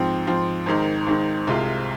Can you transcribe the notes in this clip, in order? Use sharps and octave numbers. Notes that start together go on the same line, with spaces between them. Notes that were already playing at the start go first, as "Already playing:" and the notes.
Already playing: G#2 F3 C4
G#2 F3 C4
G#1 G#2 D#3
G#1 G#2 D#3
C2 C3 G#3 F4